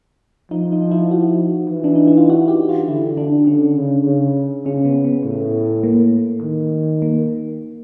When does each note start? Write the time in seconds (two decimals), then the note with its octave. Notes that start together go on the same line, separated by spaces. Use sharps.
0.51 F3 D#4
0.72 D#4
0.91 E4
1.11 F#4
1.70 E3
1.84 D4
1.95 D#4
2.07 E4
2.17 F4
2.30 F#4
2.48 G4
2.69 F4
2.88 D3 E4
3.17 D4
3.47 D3 C#4
3.76 C#3
4.06 C#3
4.66 C#3 C#4
4.85 B3
5.04 B3
5.25 A2
5.83 A#3
6.42 D#3
7.02 A#3